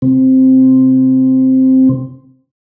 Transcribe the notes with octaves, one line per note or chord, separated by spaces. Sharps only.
C3 C4